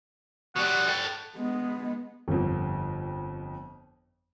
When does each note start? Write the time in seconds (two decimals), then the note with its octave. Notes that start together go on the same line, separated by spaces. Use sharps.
0.56 B2 G3 F#5
0.89 A4 G5
1.38 G#3 B3
2.28 G1 F2